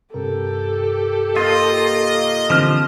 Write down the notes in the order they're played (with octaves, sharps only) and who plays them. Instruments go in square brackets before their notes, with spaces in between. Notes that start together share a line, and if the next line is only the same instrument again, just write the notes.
[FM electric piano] G2 C3 A#4 [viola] G4 A4
[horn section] A#3 D#5 [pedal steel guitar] F4
[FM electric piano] D3 E3 C4 [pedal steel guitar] F3 G4 F6